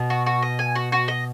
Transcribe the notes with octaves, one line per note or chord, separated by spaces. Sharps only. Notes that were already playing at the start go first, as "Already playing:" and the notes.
Already playing: B2 B3
F#4
F#4
D#5
G#5
F#4
F#4
D#5